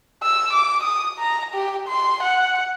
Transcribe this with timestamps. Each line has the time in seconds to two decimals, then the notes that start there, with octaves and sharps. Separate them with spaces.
0.23 E6
0.53 D6
0.83 D#6
1.19 A#5
1.54 G4
1.88 C6
2.23 F#5